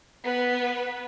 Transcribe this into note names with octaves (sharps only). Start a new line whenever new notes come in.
B3 B4